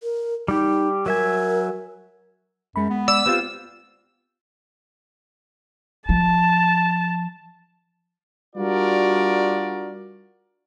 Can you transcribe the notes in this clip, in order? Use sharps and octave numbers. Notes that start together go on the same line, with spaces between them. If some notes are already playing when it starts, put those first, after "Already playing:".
A#4
G3 D#4 G4
F#3 A#4 E5 G#5
F#2 G#3 B5
B3
D5 E6
B3 C4 F4 G4
F3 A5
G3 D4 F4 F#4 A#4 D5